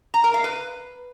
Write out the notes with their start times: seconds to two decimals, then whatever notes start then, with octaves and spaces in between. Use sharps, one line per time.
0.14 A#5
0.24 A#4
0.34 F5
0.44 B4